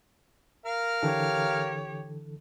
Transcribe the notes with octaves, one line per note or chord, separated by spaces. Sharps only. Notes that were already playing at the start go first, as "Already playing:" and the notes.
A#4 F5
D3 E3 G4 A4 C#5